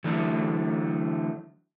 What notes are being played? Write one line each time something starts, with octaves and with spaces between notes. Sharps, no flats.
D3 E3 F#3 A3